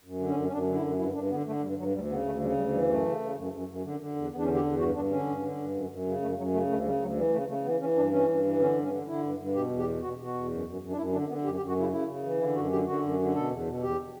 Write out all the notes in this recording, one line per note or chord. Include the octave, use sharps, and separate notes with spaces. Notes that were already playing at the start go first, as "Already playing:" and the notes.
F#2
D3
C#4
F#2
C#4
F#2 D4
D3
E4
F#2
G2 E4
G2 D4
D3 B3
D3 A3
G2 G3
G2 F#3
D2 G3
C#3 B3
D2 A3
C#3 G3
D2 G3
E3 G3
F#2 A3
C#3
C#3
F#2
F#2
F#2
D3
D3
E2
E2 B3
D4
C#4
D3
G4
E2
G2 F#4
G2 D4
D3 C#4
G2
D3
G2
F#2
F#2
C#3
F#2 A3
F#2 F#3
C#3 A3
D2 A3
C#3 G3
D2 F#3
E3 G3
C#3 A3
C#3 A3
E3 B3
E3 C#4
G2 D4
E3 C#4
G2
E3
D3 C#4
G2
C#4
D3
D3 E4
G2
G2
B2 G4
E2
G4
B2
B2 F#4
B2
F#4
E2
F#2
F#2
F#2
D4
F#2 E4
D3 D4
D3 B3
F#2 G4
G4
F#2
F#4
C#3 E4
C#3 E4
C#3
E3
D3 E4
F#2 F#4
D3 G4
D3 F#4
F#2
D3
B2 A4
E2
B2
E2 G4